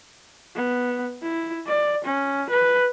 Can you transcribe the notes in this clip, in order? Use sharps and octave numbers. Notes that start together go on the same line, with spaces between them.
B3
E4
D5
C#4
B4